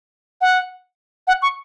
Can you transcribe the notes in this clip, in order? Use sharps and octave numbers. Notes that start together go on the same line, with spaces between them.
F#5
F#5
C#6